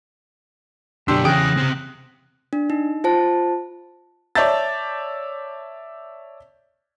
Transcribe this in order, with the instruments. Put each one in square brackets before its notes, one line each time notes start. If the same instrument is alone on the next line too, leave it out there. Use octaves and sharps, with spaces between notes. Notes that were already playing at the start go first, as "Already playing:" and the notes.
[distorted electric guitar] F#2 D3 [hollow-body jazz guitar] B2 D4 [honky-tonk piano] G4 C6 E6 [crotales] B6
[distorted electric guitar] E2 G#4 [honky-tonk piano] C#3 [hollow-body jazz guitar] G5 [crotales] D#6 F#6 A#6
[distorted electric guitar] C3 C4
[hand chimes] D4
D#4
F4 C5 A5
[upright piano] C#5 D5 E5 A5 G6 A6